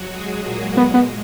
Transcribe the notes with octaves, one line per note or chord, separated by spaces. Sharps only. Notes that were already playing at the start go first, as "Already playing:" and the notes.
Already playing: F#3 F#4
G#3 G#4
A#2 A#3
G#3 B3
B3